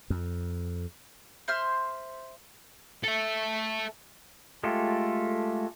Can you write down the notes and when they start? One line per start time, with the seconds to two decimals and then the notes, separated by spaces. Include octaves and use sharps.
0.10 F2
1.48 C5 E5 C6 F6
3.04 A4 E5
4.64 G#3 A3 F4 G4 A4